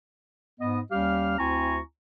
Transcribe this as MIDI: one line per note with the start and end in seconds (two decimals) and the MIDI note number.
0.60 0.80 44
0.60 0.80 59
0.60 0.80 75
0.92 1.38 39
0.92 1.38 55
0.92 1.38 61
0.92 1.38 67
0.92 1.38 77
0.92 1.38 89
1.39 1.79 38
1.39 1.79 60
1.39 1.79 64
1.39 1.79 80
1.39 1.79 82
1.39 1.79 85